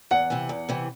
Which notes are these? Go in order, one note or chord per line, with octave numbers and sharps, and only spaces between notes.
E2 F#5
C3 E3
E2
C3 E3